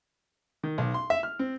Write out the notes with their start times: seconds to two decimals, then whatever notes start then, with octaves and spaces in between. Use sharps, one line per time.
0.63 D#3
0.78 B1
0.94 C6
1.10 E5
1.23 F6
1.39 C4